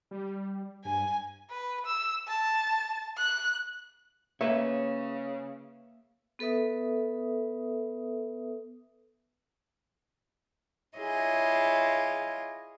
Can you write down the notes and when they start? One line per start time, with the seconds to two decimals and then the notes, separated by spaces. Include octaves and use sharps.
0.11 G3
0.85 G2 G#5
1.50 B4
1.86 E6
2.28 A5
3.18 F#6
4.41 C#3 A#3 B4 C#5 E5
6.39 B3 A4 B4 E5 D#6
10.98 E4 F4 G#4 C#5 D#5